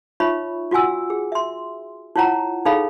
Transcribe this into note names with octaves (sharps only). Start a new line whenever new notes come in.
D#4 F4 C#5 E5 B5 C#6
F4 F#4 F#5 G#5 E6
G#4
E5 C6
E4 F4 C#5 F#5 A#5
D#4 G#4 A4 C#5 F5 B5